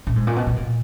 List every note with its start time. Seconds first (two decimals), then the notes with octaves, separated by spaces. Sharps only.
0.07 A#2
0.16 G#2
0.27 A#2
0.36 B2
0.47 B2
0.57 A#2